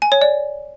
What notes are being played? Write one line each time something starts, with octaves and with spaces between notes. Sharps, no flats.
G#5
C#5
D5